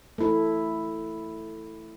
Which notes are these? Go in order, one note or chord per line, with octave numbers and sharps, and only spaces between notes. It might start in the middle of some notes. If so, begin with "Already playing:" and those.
A3 E4